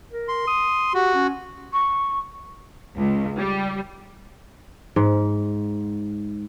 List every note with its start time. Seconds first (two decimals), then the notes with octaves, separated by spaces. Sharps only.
0.12 A#4
0.28 C6
0.48 D#6
0.94 F#4 G4
1.15 C#4
1.73 C#6
2.98 C#2
3.37 G3
4.96 G#2